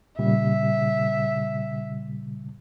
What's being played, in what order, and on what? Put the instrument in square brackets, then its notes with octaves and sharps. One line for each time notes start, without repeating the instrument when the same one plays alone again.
[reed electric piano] A#2 C#3 G3 [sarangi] E5